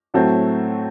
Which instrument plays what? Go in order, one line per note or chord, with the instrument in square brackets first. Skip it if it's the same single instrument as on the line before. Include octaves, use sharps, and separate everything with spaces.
[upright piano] A2 F#3 A3 C4